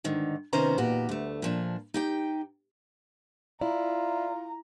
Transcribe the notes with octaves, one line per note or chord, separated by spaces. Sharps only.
G#2 D3 D#3
C3 D#3 B3 C#4 C5 A#5
E2 A#2 D#3 F#4 G4
D2 A3
A#2 F3 D4
D#4 G4 G5
E4 F4 D5 A#5